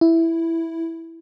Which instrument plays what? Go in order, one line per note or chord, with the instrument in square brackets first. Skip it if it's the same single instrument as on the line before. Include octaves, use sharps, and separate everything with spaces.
[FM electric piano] E4